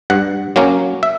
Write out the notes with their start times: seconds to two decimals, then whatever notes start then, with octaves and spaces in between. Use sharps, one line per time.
0.10 G2 F#5
0.56 F#3 A#3 C#4
1.03 E5